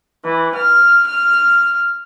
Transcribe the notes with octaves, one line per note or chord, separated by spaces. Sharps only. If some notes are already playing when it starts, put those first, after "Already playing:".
E3
F6
F6